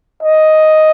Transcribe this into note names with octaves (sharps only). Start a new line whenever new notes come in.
D#5